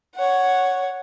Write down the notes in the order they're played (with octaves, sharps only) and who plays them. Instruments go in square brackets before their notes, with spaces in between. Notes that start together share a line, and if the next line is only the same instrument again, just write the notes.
[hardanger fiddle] C#5 F#5